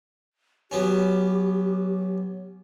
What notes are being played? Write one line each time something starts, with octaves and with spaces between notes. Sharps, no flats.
F#3 B3 C#4 G4